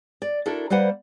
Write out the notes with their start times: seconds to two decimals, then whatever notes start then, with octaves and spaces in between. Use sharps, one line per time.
0.22 D5
0.46 D4 E4 F#4 A4 A#4
0.70 G3 A#3 B4 C5 F#5